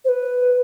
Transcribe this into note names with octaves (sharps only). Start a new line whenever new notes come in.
C5
B4